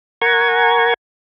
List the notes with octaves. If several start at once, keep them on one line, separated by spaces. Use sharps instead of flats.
A#4 F#5 G#5 A#5 C#6 G#6